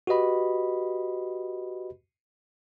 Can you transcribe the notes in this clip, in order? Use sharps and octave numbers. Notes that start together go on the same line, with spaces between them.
F#4 G4 B4 D#5 B5